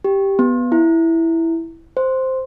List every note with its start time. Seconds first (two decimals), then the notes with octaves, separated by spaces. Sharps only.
0.04 G4
0.39 B3
0.72 E4
1.97 C5